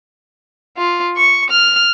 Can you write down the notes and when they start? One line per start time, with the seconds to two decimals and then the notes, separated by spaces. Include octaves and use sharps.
0.77 F4
1.17 C#6
1.50 F6